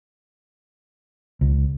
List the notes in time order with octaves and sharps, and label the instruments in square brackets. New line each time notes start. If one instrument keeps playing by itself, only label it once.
[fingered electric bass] C#2